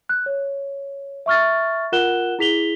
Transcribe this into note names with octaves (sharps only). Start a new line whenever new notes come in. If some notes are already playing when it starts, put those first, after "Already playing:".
F#6
C#5
E5 C#6 F6 A6
F4 A#4 F#5 F#6 E7 G7
E4 G#4 B6 F7 G7